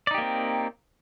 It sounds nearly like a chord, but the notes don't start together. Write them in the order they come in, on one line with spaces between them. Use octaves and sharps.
D5 D#4 G4 A#3 C4